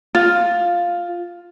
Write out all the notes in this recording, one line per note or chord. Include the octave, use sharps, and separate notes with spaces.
F4